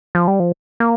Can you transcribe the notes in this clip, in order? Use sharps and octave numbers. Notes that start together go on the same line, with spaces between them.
F3
G3
F3
A#3